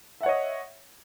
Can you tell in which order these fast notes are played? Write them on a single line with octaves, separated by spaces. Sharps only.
E5 F#5 C#5 D#5